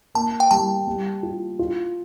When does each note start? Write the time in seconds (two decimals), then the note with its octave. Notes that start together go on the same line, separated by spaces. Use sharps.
0.15 A#3 A5
0.40 G5
0.51 G3 A5
0.87 G3
1.23 F4
1.59 F4